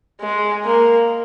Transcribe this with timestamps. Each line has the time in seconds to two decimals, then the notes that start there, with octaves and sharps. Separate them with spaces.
0.21 G#3
0.65 A#3